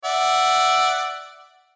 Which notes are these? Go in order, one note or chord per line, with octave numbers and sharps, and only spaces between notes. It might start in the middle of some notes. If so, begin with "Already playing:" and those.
D5 E5 F#5